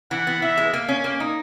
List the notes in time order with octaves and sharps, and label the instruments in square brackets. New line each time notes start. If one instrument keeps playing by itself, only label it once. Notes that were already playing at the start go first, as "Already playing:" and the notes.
[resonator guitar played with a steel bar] E3 [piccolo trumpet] F#5
[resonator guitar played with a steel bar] B3
[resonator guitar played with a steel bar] E3 [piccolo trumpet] E5
[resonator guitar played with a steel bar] G#3
A#3
C#4
A#3
D#4